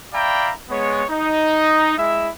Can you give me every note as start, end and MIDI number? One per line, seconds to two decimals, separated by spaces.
0.14 0.52 74
0.14 0.52 76
0.14 0.52 77
0.14 0.52 79
0.14 0.52 82
0.14 0.52 83
0.70 1.03 56
0.70 1.03 59
0.70 1.03 73
1.10 1.96 63
1.98 2.29 56
1.98 2.29 64
1.98 2.29 76